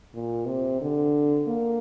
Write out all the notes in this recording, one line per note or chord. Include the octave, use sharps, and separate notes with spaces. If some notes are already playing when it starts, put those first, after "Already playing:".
A#2
C3
D3
A#3